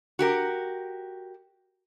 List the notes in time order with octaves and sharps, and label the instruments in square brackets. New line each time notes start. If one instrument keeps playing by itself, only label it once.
[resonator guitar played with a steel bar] F#4 G4 A#4